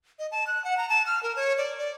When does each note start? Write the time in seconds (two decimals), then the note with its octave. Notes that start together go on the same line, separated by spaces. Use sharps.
0.19 D#5
0.31 A5
0.47 F#6
0.64 F#5
0.78 A#5
0.89 A5
1.06 F6
1.23 A#4
1.36 C#5
1.58 D5
1.78 D5